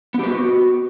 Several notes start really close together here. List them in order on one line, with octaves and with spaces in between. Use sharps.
B3 G4 B4 F#4